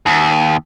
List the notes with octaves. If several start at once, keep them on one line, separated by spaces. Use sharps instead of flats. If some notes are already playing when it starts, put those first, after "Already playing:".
D#2